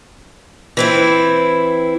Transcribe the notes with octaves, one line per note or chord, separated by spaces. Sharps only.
E3 C4 E4